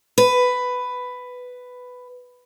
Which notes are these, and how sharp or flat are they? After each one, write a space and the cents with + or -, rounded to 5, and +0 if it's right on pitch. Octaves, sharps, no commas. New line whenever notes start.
B4 +10